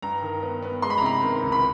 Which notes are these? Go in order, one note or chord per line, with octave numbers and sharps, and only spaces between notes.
G2 A#5
D#3
B3
B3
G#3 C6
B5
A#5
C3 B5
D#3
C#2
B5